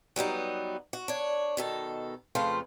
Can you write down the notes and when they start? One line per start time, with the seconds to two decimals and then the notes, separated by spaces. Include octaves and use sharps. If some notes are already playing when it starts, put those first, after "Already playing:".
0.16 F#3 G3 B3 D#4
0.93 F#4
1.08 D4 C#5
1.57 B2 D#3 A4
2.35 F2 C#3 A3 F4 B4 C5